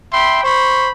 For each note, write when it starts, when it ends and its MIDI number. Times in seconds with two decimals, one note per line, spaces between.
0.12 0.42 76
0.12 0.42 79
0.12 0.42 83
0.12 0.42 84
0.43 0.90 72
0.43 0.90 83
0.43 0.90 85